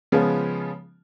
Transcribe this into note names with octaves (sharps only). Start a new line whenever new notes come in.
C#3 F3 G#3 B3 C#4 F4